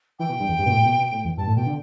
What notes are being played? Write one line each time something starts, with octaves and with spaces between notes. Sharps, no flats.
E3 G5
B2
G2
E2
G2
B2
A2
B2
B2
A2
E2
G2 A5
A2
B2 G5
D3